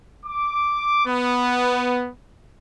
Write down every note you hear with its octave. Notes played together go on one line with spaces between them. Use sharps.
D6
B3